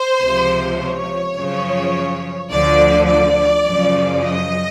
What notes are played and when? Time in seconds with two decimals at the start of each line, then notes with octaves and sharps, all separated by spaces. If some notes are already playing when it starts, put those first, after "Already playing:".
Already playing: C5
0.22 C#2 C3 F3
0.79 C#5
1.37 F#2 C#3 F3
2.50 D2 D3 F3 D5
3.08 D5
3.65 F#2 C#3 F3
4.23 D#5